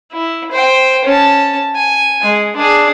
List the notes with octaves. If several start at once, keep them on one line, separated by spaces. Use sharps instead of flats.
E4
C5 G5
C#4 A5
G#5
G#3
D4 G#4